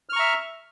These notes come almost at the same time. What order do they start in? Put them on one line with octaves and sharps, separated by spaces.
F6 C#6 A#5 E5